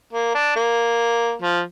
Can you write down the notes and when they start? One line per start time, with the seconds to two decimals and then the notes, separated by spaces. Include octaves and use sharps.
0.13 A#3
0.35 D4
0.56 A#3
1.42 F3